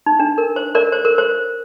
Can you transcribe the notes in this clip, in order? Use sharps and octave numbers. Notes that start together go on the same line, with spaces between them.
D#4
D4
A#4
C5
A#4 D5
C5
A#4
C5